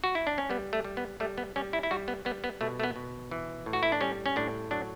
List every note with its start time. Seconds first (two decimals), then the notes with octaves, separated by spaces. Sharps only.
0.04 F#4
0.15 E4
0.27 D4
0.38 C#4
0.50 G3 B3
0.73 A3
0.85 G3
0.97 B3
1.20 G3 A3
1.38 B3
1.56 G3 C#4
1.73 E4
1.83 E4
1.91 G3 F#4
2.08 B3
2.25 G3 B3
2.44 B3
2.61 B2 A3
2.80 A3
2.83 B3
2.96 B2
3.31 E3
3.66 A2
3.73 F#4
3.83 E4
3.92 D4
4.01 G3 C#4
4.26 C#4
4.36 A2 D4
4.71 F#3 D4